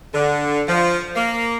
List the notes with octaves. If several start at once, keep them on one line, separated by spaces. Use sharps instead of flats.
D3
F3
A#3